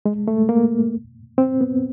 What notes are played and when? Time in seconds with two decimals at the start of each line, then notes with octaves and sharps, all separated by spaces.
0.06 G#3
0.28 A3
0.49 A#3
1.38 C4
1.61 B3